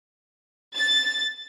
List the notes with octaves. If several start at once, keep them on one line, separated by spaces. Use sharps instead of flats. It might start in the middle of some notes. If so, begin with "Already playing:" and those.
A6